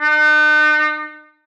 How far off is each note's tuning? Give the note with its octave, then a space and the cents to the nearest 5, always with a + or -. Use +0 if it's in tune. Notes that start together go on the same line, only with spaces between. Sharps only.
D#4 -45